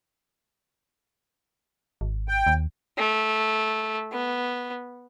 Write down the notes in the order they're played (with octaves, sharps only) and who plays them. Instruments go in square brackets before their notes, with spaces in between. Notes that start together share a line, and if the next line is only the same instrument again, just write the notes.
[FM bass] G#1
[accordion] G5
[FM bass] D#2
[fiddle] A3
B3